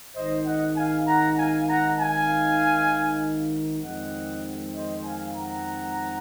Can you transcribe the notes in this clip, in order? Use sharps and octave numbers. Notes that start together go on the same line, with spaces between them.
G#1 G#2 D#3 C5 D#5
D#5 F#5
F5 G#5
F#5 A#5
F5 G#5
F#5 A#5
F5 G#5
F2 D#3 G#3 C4 D#5 F#5
C5 D#5
F5 G#5
F#5 A#5